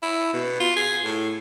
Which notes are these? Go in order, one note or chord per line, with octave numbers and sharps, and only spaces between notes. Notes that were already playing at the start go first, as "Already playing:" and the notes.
E4
B2
F4
G#4
A2